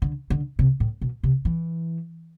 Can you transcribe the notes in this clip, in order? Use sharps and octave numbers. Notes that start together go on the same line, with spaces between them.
D3
D3
C3
A2
B2
C3
E3